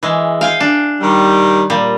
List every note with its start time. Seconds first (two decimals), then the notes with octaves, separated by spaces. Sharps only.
0.03 E3 G#3
0.41 F5 G5 G#5
0.60 D4
1.01 D#3 G3
1.70 A#2 G3